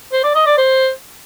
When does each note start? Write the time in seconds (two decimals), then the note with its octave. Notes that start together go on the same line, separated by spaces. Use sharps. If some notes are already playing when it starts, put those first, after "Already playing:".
0.13 C5
0.24 D5
0.35 D#5
0.46 D5
0.58 C5